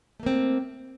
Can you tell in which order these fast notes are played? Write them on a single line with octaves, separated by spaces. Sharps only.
A3 A#3 C4